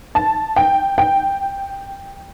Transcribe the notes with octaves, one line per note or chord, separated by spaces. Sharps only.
A5
G5
G5